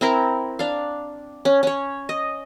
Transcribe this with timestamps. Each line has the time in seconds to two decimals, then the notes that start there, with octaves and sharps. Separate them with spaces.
0.01 C4 E4 A#4
0.59 D4 F5
1.45 C#4
1.63 C#4 C#5
2.09 D#5